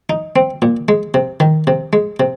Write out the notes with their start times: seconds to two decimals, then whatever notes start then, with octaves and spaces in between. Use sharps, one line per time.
0.10 D#4
0.36 C4
0.62 A#2
0.88 G#3
1.14 C3
1.40 D#3
1.67 C3
1.93 G#3
2.20 C3